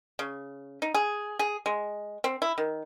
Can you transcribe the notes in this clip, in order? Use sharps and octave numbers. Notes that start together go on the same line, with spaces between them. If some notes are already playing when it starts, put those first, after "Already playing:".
C#3
D#4
G#4
G#4
G#3
C4
E4
D#3